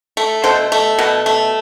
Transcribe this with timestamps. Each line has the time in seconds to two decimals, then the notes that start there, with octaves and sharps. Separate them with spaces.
0.17 A3
0.44 B2 A4 C5
0.72 A3
0.99 B2
1.26 A3